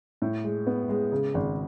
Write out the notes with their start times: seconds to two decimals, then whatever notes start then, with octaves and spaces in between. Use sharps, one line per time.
0.22 A2
0.44 G#3
0.67 B3
0.89 G#3
1.12 C#3
1.34 G#1